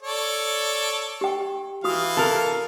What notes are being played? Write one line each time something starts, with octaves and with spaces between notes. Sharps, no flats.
A4 C#5 D5
G4 G5
E3 F4 F#4 F5 D#6
A4 A#4